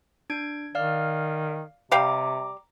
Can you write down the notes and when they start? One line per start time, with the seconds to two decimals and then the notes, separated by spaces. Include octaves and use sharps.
0.30 D4 G#6 D7
0.75 D#3 D5 F5 F6
1.92 C3 G3 F5 G5 A#5 D6